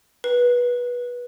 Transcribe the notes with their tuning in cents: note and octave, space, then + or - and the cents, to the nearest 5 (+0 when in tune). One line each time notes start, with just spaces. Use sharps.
B4 -20